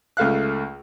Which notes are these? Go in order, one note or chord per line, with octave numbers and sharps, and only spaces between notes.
C#2 A3 F5 F#6